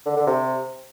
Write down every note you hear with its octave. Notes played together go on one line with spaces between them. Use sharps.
D3
D3
C3